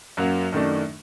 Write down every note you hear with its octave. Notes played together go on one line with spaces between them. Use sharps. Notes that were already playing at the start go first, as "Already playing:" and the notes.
F#2 F#3 A#3
F#2 D#3 A3 D4